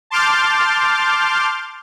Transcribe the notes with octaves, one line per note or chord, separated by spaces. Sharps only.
A5 C6 D6 F6 G6 A6